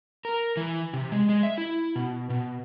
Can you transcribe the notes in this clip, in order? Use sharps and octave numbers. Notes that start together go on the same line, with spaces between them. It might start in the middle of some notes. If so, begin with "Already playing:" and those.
A#4
E3
C3
G#3
G#3
E5
E4
B2
B2